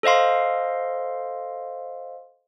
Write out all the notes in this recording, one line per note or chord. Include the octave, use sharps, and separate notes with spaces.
A4 C5 D#5 F5 C6